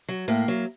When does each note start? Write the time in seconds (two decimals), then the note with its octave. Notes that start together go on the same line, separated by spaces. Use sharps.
0.08 F#3
0.28 A2 A#3
0.48 F#3